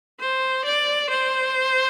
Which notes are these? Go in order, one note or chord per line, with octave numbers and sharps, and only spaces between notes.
C5
D5
C5